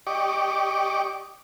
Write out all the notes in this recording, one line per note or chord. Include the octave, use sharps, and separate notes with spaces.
G4 D5 D#5 C#6 D6